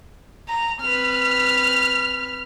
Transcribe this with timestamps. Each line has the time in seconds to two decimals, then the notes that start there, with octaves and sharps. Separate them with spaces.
0.49 A#5
0.81 C4 B4 F6